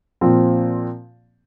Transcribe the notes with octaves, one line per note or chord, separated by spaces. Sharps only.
A#2 F3 C4